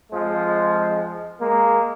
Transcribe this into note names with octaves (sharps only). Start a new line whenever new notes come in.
F2 F3 G#3
G#3 A#3